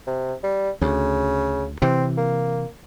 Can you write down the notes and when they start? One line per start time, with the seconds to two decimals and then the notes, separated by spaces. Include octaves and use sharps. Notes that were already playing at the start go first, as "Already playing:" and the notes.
0.07 C3
0.43 G3
0.81 D2 C#3
1.82 C3 E3 C4
2.17 A#3